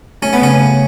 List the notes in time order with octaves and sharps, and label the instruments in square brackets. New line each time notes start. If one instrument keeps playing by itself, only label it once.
[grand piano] A3 [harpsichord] C#4
[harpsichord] B3
[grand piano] C#3 [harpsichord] C#4
[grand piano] A3